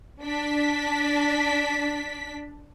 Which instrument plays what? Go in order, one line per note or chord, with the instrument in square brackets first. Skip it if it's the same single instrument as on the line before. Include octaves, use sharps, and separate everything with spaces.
[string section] D4 B6